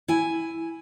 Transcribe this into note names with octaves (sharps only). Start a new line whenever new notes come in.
E4 G#5